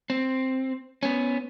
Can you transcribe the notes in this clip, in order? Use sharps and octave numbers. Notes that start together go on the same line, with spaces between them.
C4
B3 C#4